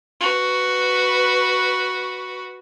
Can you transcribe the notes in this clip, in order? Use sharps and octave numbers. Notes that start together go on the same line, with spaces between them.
F#4 B4